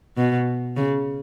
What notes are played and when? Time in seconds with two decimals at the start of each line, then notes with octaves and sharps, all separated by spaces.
0.17 B2
0.77 C#3